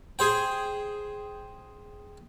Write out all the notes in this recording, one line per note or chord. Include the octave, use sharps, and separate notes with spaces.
G#4 C5 G5